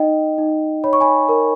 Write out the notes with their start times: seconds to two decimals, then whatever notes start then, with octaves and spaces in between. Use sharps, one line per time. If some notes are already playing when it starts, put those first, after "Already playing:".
Already playing: D#4 D#5 G5
0.38 D#4
0.84 C#5 B5
0.93 C#6
1.01 G#5 B5
1.29 A#4